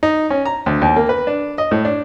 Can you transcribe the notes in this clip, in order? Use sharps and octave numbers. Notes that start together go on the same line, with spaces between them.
D#4
C#4
A#5
D2
D#2
A#3
B4
D4
D#5
A2
D4